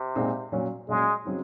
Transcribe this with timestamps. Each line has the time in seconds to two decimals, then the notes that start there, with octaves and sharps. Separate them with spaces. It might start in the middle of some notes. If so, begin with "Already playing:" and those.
Already playing: C3
0.15 A#2 G#3 C4 D#4
0.52 A#2 F#3 C#4
0.88 A#2 F#3 G#3 C#4
1.25 C#3 F#3 C4 D#4